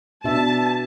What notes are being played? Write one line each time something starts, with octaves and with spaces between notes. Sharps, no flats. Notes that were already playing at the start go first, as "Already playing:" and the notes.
B2 D4 E5 A5